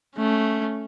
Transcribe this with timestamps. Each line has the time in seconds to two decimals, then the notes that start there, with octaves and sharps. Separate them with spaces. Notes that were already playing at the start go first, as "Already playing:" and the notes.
0.17 A3 C#4